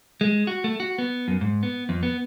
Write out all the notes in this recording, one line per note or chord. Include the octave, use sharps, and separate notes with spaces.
G#3
F#4
A3
F#4
B3
F#2
G#2
B3
F2
B3